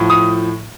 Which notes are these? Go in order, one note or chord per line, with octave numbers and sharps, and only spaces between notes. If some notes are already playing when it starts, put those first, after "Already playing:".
Already playing: A2 F3
D#6